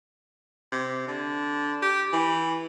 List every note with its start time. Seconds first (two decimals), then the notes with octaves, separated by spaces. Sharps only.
0.72 C3
1.07 D3
1.82 G4
2.13 E3